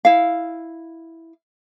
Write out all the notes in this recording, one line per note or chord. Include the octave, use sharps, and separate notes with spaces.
E4 F5